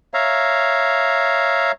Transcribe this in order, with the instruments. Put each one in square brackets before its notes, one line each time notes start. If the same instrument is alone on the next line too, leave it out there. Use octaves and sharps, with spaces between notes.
[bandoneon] C#5 E5 F5 A#5